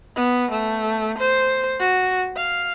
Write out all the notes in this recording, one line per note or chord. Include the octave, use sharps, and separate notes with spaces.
B3
A3
C5
F#4
F5